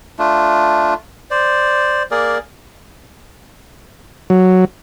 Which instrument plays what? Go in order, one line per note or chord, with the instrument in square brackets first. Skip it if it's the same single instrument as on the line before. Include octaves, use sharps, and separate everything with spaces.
[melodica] A3 D4 F4
C5 D5
A#3 G#4 A#4 D5
[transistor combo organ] F#3